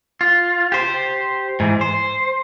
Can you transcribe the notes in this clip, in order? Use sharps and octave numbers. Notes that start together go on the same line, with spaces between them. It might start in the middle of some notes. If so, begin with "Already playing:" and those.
F4
G4 C5
G#2 E3
C5